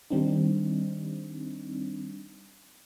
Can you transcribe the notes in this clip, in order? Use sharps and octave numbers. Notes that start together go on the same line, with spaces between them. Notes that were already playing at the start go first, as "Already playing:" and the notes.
D#3 G3 C4 D4 D#4